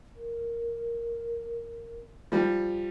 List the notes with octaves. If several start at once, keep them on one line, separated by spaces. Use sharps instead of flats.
A#4
F3 G3